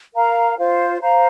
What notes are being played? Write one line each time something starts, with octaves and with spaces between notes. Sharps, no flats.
A#4 F5 A#5
F4 C5 F5
C5 F5 A#5